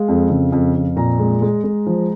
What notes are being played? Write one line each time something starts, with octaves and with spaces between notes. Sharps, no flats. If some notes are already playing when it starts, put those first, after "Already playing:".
Already playing: G#3 F5
F2
C#3
F2
F2
A#2 A#5
G#3
G#3
G#3
F3